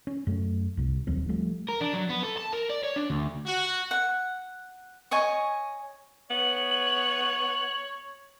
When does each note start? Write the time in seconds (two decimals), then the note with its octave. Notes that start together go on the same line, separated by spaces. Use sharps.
0.07 C#4
0.27 F#2 A3
0.77 C2 C3
1.07 D#1 D#2 F#3 C4
1.29 F3 G3 A3
1.69 A#4
1.81 D4
1.93 F#3
2.09 B3
2.23 A4
2.37 A5
2.53 A#4
2.69 D5
2.83 C#5
2.96 D4
3.10 D2
3.46 F#4
3.91 F#5
5.11 C#5 D#5 G#5 C#6
6.30 B3 C#5 F#7